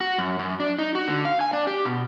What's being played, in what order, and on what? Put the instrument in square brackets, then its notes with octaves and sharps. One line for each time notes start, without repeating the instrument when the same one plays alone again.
[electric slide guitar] F#4
F#2
F#2
D4
D#4
F#4
D3
F5
G#5
D4
G4
B2